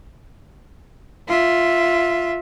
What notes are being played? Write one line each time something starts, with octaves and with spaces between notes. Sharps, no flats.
F4 E5